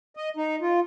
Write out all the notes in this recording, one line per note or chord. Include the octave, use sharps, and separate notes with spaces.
D#5
D#4
F4